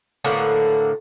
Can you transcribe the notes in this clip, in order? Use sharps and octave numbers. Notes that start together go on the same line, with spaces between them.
A2 D3 A#3 B3